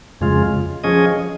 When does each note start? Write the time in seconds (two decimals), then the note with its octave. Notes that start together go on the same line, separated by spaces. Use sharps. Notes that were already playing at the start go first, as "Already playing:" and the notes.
0.21 F2 C#3 G#3 F4
0.84 F3 C#4 G#4 D#5